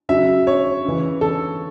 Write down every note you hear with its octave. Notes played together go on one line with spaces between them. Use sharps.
C#3 F#3 E5
C#5
C#3 E3
A4